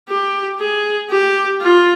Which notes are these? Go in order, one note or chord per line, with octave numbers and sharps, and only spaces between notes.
G4
G#4
G4
F4